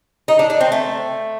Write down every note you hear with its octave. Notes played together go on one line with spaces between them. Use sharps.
D#4
D4
D4
C4
A3